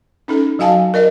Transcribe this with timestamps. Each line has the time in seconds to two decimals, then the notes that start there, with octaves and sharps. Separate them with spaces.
0.28 C#4 D#4 A4
0.59 F#3 F#4 F5 G#5 A5
0.94 A#4 D5 D#5